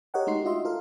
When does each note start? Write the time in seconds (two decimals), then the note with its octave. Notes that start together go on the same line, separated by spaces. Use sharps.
0.14 G4 A#4 C#5 D#5 F#5 G5
0.27 G#3 A3 D#4 F#4 C6 C7
0.44 D4 F4 F#4 D#5 E5 C6
0.65 F4 A4 A#4 F5